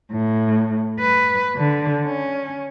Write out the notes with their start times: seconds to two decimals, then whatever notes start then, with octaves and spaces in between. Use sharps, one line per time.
0.11 A2
0.99 B4
1.56 D3
2.05 C#4